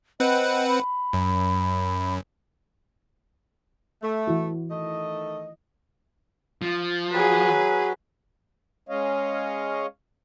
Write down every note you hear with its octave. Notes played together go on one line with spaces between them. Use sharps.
C4 B4 D#5 F#5
B5
F#2
A3
E3 E4 F#4
D#3 A3 D#5
F3
F#3 G#4 B4
G#3 C#4 C#5 D#5 F5